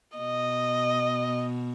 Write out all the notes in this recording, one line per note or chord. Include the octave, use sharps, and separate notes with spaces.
B2 D#5